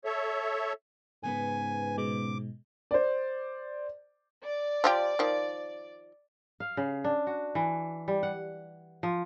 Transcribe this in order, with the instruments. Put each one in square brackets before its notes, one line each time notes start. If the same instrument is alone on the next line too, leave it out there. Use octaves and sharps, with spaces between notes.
[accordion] A4 C#5 E5
[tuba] G#2 [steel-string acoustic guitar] C#3 B3 B4 [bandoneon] G#5
[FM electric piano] B2 G#3 [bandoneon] D6
[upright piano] C5 D5
[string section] D5
[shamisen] F3 F4 G4
D#3 F3
[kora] F5
C#3
D4
F#4
E3
G3
F#5
F3